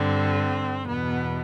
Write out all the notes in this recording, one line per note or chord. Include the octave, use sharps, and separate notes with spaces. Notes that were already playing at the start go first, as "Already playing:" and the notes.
Already playing: G2 D3 C4
E2 B2 B3